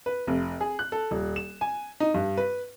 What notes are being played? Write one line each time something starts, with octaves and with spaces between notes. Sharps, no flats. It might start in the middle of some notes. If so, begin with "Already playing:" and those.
B4
F1
G#4
F#6
A4
D#1
E7
G#5
D#4
G2
B4